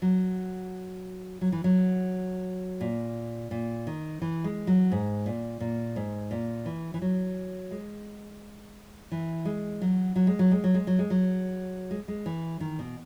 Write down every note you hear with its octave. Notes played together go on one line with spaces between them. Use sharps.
F#3
F#3
E3
F#3
A#2
A#2
D#3
E3
G#3
F#3
G#2
A#2
A#2
G#2
A#2
E3
E3
F#3
G#3
E3
G#3
F#3
F#3
G#3
F#3
G#3
F#3
G#3
F#3
G#3
F#3
G#3
G#3
E3
D#3
B2